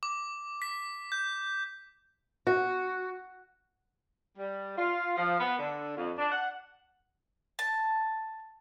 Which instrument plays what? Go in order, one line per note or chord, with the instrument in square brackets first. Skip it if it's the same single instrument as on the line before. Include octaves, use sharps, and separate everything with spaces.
[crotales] D6
B6
G6
[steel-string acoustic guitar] F#4
[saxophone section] G3
F4
F3
B3
D3
F2
D4
F#5
[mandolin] A5